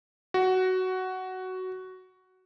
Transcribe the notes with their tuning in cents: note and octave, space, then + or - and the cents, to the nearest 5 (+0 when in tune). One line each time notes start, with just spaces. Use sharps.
F#4 +10